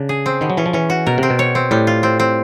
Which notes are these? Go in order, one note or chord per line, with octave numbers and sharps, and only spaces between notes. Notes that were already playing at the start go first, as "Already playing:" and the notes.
Already playing: C#3 D4
G#4
C4
B2 D#3
F#3
E3 C#4
F3
E3 C#4
F#4
B2 A#4
C3 C4
B2
C#5
C4
A2 G3
F4
C4
C4